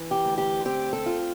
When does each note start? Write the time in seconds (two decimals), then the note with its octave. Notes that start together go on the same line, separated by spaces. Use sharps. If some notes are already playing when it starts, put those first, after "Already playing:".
Already playing: E3
0.11 G4
0.25 D2
0.38 G4
0.65 C4 G4
0.93 A4
1.06 F4